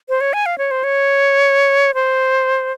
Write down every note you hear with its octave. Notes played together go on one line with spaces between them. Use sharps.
C5
C#5
G#5
F5
C#5
C5
C#5
C5